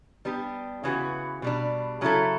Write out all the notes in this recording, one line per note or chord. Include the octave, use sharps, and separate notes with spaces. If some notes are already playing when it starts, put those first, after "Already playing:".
G3 B3 D4 G4
C#3 E3 B3 F#4
B2 G3 D4
C#3 F#3 C#4 E4 A4